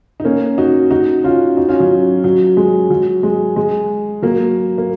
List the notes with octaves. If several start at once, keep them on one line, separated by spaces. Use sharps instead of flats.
D#4
A#3 C#4
D#4 F#4
D#4 F#4
C#4 F4
D#4 F#4
C#4 F4
F#3
F#3
G#3
F#3
G#3
G#3
F#3 A#3
A#3